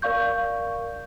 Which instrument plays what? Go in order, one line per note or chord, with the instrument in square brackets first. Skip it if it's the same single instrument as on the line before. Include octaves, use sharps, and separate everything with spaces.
[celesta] A#4 D5 F5 C#6 G6